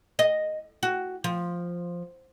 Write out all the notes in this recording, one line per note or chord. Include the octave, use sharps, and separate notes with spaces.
D#5
F#4
F3